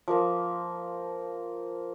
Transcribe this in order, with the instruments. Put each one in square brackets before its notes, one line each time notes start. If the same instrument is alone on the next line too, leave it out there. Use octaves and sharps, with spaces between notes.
[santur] F3 A#3 A#4